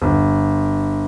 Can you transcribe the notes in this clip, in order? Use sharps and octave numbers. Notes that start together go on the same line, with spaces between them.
G1